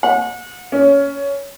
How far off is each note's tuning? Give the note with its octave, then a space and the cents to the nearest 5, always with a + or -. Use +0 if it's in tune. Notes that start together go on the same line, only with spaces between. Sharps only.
F#5 -35
C#4 +15